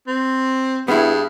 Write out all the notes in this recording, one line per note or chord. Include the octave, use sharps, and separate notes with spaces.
C4
G2 B3 E4 G#4